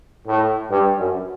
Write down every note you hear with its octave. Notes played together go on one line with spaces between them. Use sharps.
A2
G2
F#2